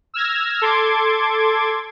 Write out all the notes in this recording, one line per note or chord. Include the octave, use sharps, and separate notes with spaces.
E6 F6 G#6 A#6
A4 C6 D6 G#6